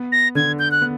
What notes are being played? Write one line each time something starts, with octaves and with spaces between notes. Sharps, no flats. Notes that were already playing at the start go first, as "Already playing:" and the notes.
Already playing: B3
A#6
D3 G#6
G6
F#6
B3